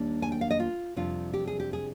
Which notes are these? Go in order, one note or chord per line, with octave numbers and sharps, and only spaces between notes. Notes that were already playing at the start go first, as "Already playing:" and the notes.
Already playing: D#2 G3 A#3 D4
G#5
G5
F5
D#5
F4
F2 C3 G3 D4 F4
G4
G#4
G4
G#4